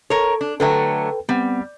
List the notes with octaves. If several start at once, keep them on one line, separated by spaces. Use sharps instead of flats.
A4 A#4 C#5
D4
D3 F#3 A3 A4 B4 G5
G3 B3 C4 F#5